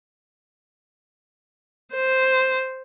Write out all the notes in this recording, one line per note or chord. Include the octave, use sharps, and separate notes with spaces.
C5